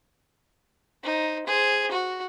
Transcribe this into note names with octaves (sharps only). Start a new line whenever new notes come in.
D#4 C5
G#4 C5
F#4